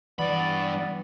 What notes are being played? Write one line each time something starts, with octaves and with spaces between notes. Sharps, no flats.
G2 E3 B3 D5 B5